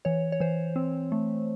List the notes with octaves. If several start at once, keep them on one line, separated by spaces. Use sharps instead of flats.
E3 C#5
C#5
E3 C5
C4
A3